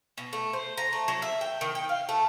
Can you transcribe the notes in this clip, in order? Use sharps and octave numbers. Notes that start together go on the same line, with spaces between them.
B2
A3
C5
A#5
A3
F#3
E5
G5
D#3
G5
F5
A3